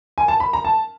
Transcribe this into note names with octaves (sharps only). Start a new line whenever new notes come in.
G#5
A5
B5
A#5
A5